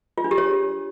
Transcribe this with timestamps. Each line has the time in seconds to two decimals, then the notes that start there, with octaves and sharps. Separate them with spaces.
0.18 F4
0.24 D4
0.31 G4
0.38 C#5